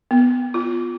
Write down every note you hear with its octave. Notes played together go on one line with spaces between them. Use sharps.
B3
F4